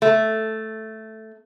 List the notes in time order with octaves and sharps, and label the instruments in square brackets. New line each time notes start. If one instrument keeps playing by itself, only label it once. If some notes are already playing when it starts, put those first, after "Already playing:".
[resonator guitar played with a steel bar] A3